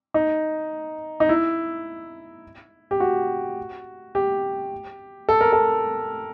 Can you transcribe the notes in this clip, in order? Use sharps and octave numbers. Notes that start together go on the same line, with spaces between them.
D#4
D#4
E4
G4
F#4
G4
A4
A#4
A4